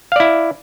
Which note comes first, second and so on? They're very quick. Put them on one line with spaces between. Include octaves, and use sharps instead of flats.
F5 D5 E4